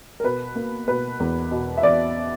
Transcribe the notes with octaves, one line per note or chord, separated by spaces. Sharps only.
A#4
B2 B4
A#3
B2 B4
E2
B2
E5
E2 D5